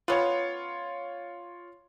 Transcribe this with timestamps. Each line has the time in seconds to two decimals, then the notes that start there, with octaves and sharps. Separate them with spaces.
0.08 B3 C#4 F4 C#5